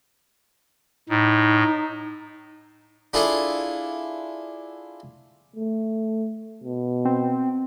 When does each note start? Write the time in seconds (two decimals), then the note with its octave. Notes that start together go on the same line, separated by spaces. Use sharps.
1.09 A2 D#4
3.14 D4 E4 F4 G#4 A4
5.56 A3
6.64 B2
7.05 C4